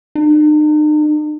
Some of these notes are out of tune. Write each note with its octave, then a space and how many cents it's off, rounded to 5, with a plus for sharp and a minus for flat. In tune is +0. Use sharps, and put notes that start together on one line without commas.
D#4 -45